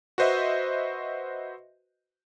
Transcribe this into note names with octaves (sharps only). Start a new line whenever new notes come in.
F#4 B4 C5 D#5 E5